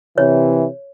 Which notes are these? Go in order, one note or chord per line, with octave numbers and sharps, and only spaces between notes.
C3 E3 C#5